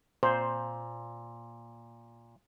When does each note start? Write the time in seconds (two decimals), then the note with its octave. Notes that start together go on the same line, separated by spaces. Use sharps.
0.23 A#2 C5